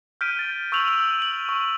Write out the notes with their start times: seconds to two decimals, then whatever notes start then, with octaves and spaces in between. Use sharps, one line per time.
0.21 F6 G6 B6 D7 D#7
0.39 A6
0.72 C#6 E6 G6 D7 F7 F#7
0.88 E6
1.22 F#7
1.49 C#6